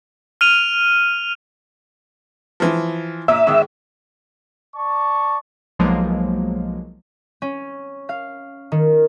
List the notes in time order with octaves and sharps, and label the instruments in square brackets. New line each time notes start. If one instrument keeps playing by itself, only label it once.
[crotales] F6 D#7 F7
[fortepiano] E3 F3
[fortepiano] A#2 [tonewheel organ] E5
[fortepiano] G#2 D#3
[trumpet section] D5 A5 C#6
[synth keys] B1 F3 F#3 G#3 A#3
[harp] C#4
F5
D#3